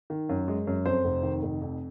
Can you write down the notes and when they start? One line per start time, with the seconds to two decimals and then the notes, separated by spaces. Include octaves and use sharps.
0.10 D#3
0.29 F#2
0.48 G#3
0.67 F#2
0.85 F2 C5
1.04 F1
1.23 D#3
1.43 F1
1.61 F2